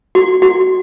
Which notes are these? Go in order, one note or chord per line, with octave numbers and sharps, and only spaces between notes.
F#4
F#4